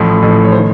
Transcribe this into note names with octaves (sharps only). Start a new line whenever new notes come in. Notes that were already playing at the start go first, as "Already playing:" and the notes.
Already playing: A1 A2 F3
A1 A2 F3
C#5
C5
D#3